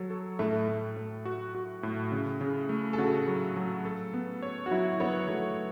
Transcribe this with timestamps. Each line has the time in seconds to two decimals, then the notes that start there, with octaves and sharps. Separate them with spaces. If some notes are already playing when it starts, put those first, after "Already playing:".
Already playing: F#3 A4 C#5
0.10 A4
0.39 A2 A3
0.68 A2
0.97 A2
1.25 F#4
1.55 F#4
1.83 A2
2.12 C#3
2.41 C#3
2.69 A3
2.93 A4
2.98 C#3 F#4
3.28 F#3
3.56 F#3
3.85 A4
4.14 B3
4.42 C#5
4.66 F#4
4.71 F#3 E4
5.00 B3 C#5
5.28 F#3 A3